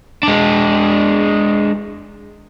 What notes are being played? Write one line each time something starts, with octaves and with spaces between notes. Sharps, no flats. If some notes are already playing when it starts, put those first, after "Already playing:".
G#3 D4